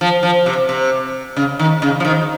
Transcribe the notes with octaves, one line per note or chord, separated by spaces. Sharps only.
F3
F3
C3
C3
C#3
D#3
C#3
F3
D#3